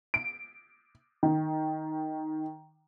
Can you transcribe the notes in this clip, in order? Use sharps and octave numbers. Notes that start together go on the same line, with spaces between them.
D7
D#3